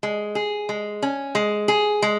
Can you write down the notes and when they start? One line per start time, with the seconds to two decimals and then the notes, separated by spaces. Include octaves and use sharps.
0.03 G#3
0.35 G#4
0.69 G#3
1.02 C#4
1.35 G#3
1.68 G#4
2.02 G#3